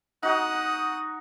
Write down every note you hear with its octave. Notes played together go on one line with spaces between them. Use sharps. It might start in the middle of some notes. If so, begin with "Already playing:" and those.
D#4 F#4 F#5 A#5 D#6